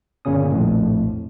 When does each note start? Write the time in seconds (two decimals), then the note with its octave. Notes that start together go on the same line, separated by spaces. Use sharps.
0.25 G1 A#2 C#3 C#4 D#6
0.52 A#1 F2 A2